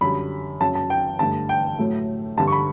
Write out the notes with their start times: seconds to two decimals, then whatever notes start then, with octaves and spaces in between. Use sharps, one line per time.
0.01 F#2 D3 G3 B5
0.60 F#2 C#3 F#3 A5
0.75 A5
0.90 G5
1.19 G2 D3 A3 A5
1.49 G5
1.79 A2 F#3 A3
2.37 G2 D3 G3 A5
2.47 C#6
2.52 B5